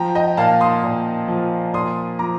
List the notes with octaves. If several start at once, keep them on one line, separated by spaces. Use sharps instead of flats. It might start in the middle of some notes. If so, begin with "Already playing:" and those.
Already playing: F3 G5 A#5
D#5 G5
A#2 F5 A5
C6 D#6
A#2
F3
A#2 C6 D#6
F3 A#5 D6